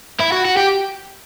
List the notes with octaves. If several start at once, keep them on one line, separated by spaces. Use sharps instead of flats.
E4
F#4
F#4
G4